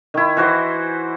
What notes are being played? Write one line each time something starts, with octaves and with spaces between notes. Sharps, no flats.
D#3 E4
E3 F#4 C5